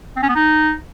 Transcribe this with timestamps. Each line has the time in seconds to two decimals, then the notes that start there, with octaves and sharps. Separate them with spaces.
0.16 C4
0.23 C#4
0.29 B3
0.35 D#4